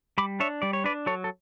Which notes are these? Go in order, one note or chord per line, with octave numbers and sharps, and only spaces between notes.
G3 B5 D6
D4 C#5 E5
G3 D5
C#5
D4 B4 D5
F#3 A4 C#5
A4